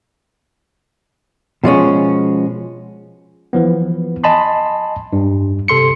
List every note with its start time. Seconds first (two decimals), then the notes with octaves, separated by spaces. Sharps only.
1.64 B2 F3 G#3 C#4
3.53 E3 F3 B3
4.24 D#5 G#5 A5 B5 C6
5.13 G2
5.68 C3 A4 C6 C#7